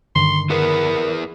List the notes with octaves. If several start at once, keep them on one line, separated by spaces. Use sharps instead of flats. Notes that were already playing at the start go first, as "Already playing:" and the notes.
G2 D3 D#3 C6
B3 E4 G#4 A#4 B4